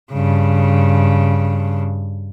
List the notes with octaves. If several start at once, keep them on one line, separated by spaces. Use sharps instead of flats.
G2 C#3